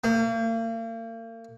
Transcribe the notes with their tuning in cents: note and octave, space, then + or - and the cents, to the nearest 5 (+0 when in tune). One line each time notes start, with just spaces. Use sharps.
A#3 -40